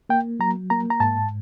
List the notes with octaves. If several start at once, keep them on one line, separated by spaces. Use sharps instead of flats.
A#3 G5
F#3 A#5
A#3 A#5
A#5
G#2 A5